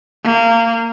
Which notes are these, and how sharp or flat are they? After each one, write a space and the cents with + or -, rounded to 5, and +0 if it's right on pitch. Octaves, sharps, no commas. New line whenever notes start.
A#3 -25